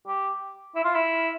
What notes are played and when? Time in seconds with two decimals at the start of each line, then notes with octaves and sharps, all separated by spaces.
0.07 G4
0.76 E4
0.84 F4
0.95 E4